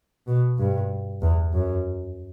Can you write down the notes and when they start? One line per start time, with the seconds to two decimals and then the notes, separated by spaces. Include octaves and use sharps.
0.27 B2
0.59 G2
1.22 E2
1.53 F#2